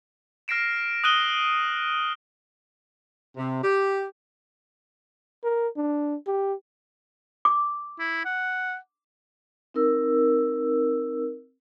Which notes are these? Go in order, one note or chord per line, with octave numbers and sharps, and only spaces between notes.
F6 A#6 C7 D7 E7
D#6 F#6 D#7 G7
C3
G4
A#4
D4
G4
D6
E4
F#5
C4 D#4 A#4 E6